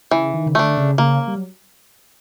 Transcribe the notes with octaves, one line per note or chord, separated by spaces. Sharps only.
C#3 E3
D#3
C#3
D3 A3 D4
C#3
C#3 A#3
G3
F#3